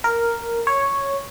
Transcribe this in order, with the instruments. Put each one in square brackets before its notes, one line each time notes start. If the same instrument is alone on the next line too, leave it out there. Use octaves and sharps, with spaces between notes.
[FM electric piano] A#4
C#5